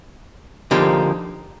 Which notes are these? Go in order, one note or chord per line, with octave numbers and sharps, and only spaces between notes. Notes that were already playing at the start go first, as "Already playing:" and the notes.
D3 F3 A#3 D#4 G4